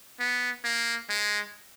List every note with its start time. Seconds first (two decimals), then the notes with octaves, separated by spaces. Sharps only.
0.20 B3
0.64 A#3
1.09 G#3